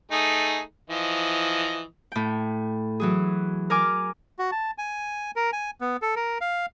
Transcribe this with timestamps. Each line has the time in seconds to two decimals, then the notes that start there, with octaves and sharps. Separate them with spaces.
0.12 A3 D#4 G#4
0.90 E3 F3 D#5
2.12 A2 G5
3.00 E3 F#3 G#4
3.70 A#4 G#5 D6 F6
4.39 F#4
4.52 A5
4.78 G#5
5.36 A#4
5.53 G#5
5.81 B3
6.02 A4
6.16 A#4
6.41 F5